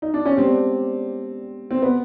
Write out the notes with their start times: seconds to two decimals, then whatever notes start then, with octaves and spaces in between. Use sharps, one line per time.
0.02 D#4
0.14 D4
0.25 C#4
0.37 G#3 B3 C4 D4 G4
1.71 C4
1.82 B3